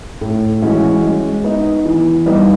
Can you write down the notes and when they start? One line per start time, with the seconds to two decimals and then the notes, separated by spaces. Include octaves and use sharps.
0.21 A2
0.62 E3 G#3 C#4 F#4
1.03 G#3
1.44 B3 D#4
1.86 E3
2.26 G3 B3 D#4